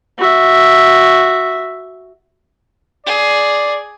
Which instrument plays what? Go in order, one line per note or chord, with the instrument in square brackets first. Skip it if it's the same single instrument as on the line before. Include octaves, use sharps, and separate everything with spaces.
[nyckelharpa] F#4 E5
[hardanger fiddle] G#4 [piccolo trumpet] D5